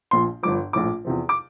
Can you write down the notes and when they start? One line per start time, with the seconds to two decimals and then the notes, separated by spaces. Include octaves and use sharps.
0.11 A#1 A#2 F3 C6
0.43 G1 G2 F3 D6
0.73 A#1 A2 F3 D6
1.05 E2 C3 F3
1.29 D6